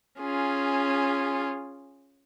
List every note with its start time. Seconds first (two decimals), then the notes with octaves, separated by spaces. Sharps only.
0.21 C#4 F4 G#4